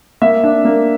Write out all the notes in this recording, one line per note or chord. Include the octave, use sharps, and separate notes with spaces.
A#3 E5
D4
A#3